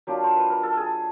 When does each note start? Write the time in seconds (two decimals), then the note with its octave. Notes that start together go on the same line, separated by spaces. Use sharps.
0.07 F#3 A#3 D4 F4 G4
0.24 C5
0.36 B4
0.50 A#4
0.63 A4
0.77 G#4